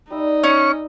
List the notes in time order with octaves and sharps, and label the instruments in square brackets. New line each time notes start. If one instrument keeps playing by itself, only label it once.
[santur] G3 E5 [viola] D#4
[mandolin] C#4 [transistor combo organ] C#6